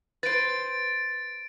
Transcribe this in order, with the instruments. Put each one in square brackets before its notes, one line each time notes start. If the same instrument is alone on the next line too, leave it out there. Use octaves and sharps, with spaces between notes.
[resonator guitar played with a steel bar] B4 C5 [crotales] A6 D7